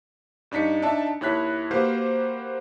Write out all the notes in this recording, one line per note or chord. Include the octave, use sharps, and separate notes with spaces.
G2 D4 D#4 B6 C#7
D4 D#4 E5 A5
D#2 E4 C#5 F#6 B6
A#3 F#4 G4 B4 C5 F5